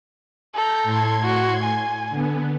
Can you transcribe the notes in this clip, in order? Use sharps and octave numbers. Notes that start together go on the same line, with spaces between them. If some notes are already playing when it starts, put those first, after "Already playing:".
A4 A#5 G6
A2 C6 G#6
F#4
G#5
D3 B3